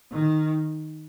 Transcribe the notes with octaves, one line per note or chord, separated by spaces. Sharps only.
D#3